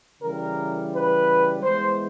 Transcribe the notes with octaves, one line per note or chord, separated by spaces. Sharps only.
C#3 E3 G3 A#4
B4
E3 G#3 B3 C5